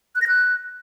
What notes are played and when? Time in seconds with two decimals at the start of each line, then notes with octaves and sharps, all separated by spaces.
0.15 F#6
0.21 A#6
0.28 F#6